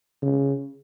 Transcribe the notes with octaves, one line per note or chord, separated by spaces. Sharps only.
C#3